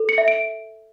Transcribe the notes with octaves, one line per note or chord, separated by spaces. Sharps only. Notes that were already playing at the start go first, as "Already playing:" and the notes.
Already playing: A4
C#7
E5
D7